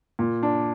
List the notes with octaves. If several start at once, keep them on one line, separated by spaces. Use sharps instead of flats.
A#2
D4